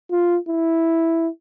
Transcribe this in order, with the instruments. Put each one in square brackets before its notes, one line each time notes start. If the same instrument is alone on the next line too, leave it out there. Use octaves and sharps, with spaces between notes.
[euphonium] F4
E4